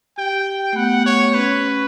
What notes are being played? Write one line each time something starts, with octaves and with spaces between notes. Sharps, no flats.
G4 G5
A3
B3 F#5
C#5
C#4 B4